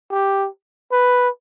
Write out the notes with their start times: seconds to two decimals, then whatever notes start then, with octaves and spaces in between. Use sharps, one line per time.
0.11 G4
0.92 B4